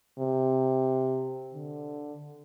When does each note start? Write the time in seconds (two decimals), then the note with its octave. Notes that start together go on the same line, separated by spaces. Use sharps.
0.18 C3
1.54 D3